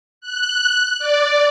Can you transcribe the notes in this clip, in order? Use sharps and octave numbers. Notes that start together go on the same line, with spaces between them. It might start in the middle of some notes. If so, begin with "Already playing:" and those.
F#6
D5